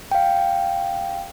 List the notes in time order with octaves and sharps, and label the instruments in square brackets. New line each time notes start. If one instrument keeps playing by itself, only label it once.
[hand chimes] F5 G5